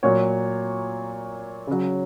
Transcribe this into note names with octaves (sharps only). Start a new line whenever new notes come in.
A#2 F#3 C#5
C#3 F#3